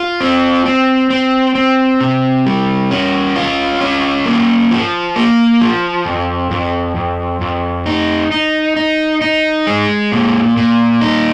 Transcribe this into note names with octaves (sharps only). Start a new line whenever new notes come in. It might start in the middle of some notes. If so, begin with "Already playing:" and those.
Already playing: F4
C4
C4
C4
C4
C3
G3
C#4
F4
C#4
A#3
F3
A#3
F3
F2
F2
F2
F2
D#4
D#4
D#4
D#4
G#3
A#2
A#2
D#4